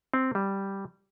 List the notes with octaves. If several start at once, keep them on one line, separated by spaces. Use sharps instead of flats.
C4
G3